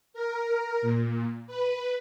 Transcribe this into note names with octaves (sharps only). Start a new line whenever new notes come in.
A#4
A#2
B4